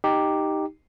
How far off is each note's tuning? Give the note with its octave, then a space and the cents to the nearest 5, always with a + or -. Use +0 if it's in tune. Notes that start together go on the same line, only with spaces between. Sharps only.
D#4 +0 G4 +0